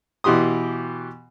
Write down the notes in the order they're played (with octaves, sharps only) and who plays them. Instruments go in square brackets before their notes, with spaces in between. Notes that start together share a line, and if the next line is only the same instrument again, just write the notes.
[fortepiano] B2 E3 G4 C6 D#6